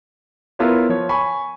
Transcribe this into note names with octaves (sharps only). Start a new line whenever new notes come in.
B3 E4 F4 A#4 B4 C#5
F3 C#5
G#5 B5 C#6